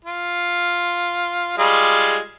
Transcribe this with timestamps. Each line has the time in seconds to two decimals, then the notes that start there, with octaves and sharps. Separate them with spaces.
0.05 F4
1.58 G3 G#3 F4